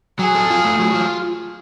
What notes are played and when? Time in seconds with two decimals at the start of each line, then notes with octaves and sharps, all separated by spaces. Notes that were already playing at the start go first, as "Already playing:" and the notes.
0.19 F#3 G#4
0.35 A4
0.50 F4
0.65 A3
0.79 F#3
0.94 F4